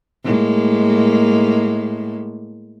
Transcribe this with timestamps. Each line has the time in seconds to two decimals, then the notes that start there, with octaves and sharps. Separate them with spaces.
0.24 A2 G#3 A#3